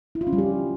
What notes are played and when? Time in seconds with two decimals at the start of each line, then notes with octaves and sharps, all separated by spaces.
0.15 E4
0.21 F4
0.27 C#4
0.33 G3
0.38 G4